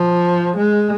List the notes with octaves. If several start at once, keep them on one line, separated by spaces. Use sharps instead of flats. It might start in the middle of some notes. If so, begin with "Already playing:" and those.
Already playing: F3
G#3